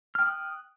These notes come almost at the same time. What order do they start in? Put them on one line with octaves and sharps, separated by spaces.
F6 G5 D#6 F#6